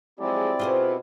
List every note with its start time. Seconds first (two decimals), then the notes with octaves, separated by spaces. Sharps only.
0.19 F3 F#3 G#3 C4 E4 G4 D5
0.59 B2 F4 G#4 C5